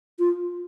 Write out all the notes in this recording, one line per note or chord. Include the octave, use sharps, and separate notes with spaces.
F4